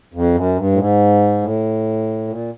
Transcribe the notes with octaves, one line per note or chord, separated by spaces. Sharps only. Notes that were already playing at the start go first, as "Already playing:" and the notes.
F2
F#2
G2
A2
G#2
A2
A#2